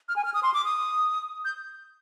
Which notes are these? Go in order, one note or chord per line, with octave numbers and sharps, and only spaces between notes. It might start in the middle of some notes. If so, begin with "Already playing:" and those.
F6
G#5
F6
D#6
C6
D6
D#6
G6